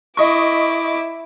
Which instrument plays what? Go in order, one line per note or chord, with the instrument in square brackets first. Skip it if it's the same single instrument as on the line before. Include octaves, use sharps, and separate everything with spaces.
[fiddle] E4 D6 [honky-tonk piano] D#5 C#6